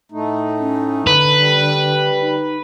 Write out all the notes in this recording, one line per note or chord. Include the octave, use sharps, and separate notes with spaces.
A2 A3 D#4
C#4
D3 B4
G3
D#4